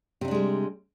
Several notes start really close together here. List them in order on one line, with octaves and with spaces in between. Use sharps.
C3 D#4 D4 G#3 G3